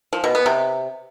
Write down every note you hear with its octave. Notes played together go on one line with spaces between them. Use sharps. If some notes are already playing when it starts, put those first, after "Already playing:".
F3
B2
B3
C3